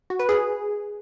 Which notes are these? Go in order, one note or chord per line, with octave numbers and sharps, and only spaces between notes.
F#4
B4
G#4